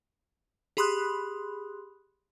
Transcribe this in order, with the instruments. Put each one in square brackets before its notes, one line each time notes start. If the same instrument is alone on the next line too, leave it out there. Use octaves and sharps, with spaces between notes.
[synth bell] G4 G#4 B5 C6 D#6 F#6